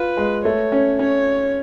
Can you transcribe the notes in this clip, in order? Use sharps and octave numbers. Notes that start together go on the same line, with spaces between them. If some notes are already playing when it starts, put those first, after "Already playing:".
Already playing: F4 B4
G#3
A3 C#5
C#4
C#4 C#5